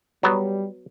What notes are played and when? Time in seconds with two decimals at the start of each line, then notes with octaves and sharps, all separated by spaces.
0.23 F#3 G3 B3